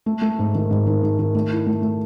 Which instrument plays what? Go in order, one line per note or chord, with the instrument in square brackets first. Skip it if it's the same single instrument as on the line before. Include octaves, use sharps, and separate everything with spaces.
[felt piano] A3
A3
G#2
D#3
G#2
D#3
G#2
D#3
A3
E4
A3
A3